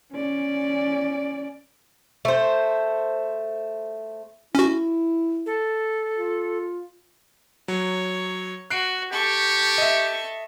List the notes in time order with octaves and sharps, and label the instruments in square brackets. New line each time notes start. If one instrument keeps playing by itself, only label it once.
[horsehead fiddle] C#4 D5
[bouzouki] A3 C5
[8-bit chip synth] C#4 F#4 [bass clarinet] E4
[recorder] A4
[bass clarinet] F4
[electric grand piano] F#3 [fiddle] C#5
[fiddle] F#4 [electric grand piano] F#6 C7 D7
[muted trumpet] G4 [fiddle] A4 C#6
[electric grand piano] D#5 E5